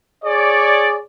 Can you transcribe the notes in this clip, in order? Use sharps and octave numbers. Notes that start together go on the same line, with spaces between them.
G#4 C#5 D5